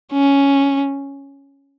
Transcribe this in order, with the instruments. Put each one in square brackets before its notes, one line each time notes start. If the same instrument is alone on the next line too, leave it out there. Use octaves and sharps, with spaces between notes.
[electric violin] C#4